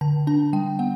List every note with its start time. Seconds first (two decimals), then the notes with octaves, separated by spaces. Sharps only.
0.01 D3 A5
0.27 D4 A5
0.53 G3 G5
0.79 B3 F#5